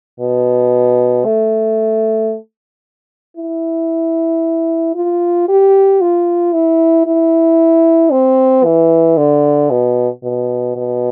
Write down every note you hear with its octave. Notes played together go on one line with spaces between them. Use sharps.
B2
A3
E4
F4
G4
F4
E4
E4
C4
E3
D3
B2
B2
B2